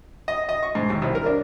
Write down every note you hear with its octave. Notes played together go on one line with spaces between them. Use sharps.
D#5
D#5
C#6
G#2
D#2
C2
A#4
D4